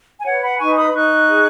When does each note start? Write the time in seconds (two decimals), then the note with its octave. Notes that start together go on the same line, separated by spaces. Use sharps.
0.20 G#5
0.25 B4 C#5 F#5
0.43 F#5 B5
0.59 D#4 G#5 C#6
0.77 B5 D#6
0.94 D#4 C#6 F#6
1.28 G#4